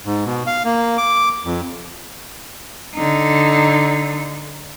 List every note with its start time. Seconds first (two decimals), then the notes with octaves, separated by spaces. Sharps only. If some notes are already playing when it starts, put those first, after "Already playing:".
0.06 G#2
0.26 B2
0.47 F5
0.65 A#3
0.98 D6
1.45 F2
2.95 D3 D#4